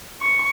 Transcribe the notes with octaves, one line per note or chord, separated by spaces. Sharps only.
C#6